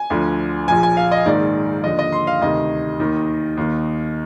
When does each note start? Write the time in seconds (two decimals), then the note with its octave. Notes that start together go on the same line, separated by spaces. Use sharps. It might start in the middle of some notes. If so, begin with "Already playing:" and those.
Already playing: G#5
0.10 D2 D3 F3
0.68 A#1 A#2 F3 G#5
0.83 G#5
0.97 F5
1.11 D#5
1.26 A#1 G#2 D#3 D5
1.84 D#2 D3 F3 D#5
1.99 D#5
2.12 C6
2.27 F5
2.41 D2 C3 D#3 D#5
2.99 D#2 D#3
3.57 D#2 D#3